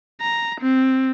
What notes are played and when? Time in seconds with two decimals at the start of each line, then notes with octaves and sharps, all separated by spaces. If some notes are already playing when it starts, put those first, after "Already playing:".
0.21 A#5
0.61 C4